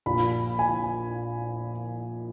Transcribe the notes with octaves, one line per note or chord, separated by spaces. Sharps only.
A#1 A#2 B5
G#5